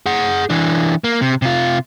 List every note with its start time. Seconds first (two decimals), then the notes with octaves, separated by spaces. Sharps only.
0.06 G#4 F#5
0.50 E3 D4
1.04 A#3
1.21 C3
1.42 C3 F4